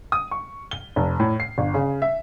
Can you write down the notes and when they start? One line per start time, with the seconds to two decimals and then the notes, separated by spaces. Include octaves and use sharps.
0.12 D#6
0.31 C#6
0.71 G7
0.96 F1
1.20 A2
1.40 C7
1.58 G1
1.74 C#3
2.02 E5